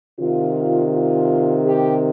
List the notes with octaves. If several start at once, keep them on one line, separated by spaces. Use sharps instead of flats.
C3 D#3 F4
F4
G4